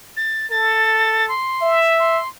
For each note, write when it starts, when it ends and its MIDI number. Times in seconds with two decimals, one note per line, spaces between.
0.17 0.49 93
0.50 1.32 69
0.50 1.26 93
1.28 1.79 84
1.62 2.20 76
1.99 2.28 84